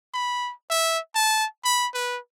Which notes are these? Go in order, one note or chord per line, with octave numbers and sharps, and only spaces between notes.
B5
E5
A5
B5
B4